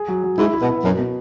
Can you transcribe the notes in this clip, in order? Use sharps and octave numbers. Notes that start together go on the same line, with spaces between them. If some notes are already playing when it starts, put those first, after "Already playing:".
Already playing: G#4
F#3
F#3
G#2 E4
E4
B2
B3
F#2 B2
B2